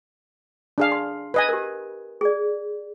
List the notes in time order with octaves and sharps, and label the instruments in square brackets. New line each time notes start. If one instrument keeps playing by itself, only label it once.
[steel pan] D4 G#4 F5
[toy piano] C6
[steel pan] B4 D#5 G#5
[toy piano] G4 A#4
G#4 D5